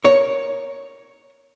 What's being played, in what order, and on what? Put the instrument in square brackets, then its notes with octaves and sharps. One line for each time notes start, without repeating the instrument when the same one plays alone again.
[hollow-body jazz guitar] A#4 C#5